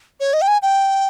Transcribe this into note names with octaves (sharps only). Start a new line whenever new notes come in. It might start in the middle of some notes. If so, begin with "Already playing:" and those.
C#5
D#5
G5
G#5
G5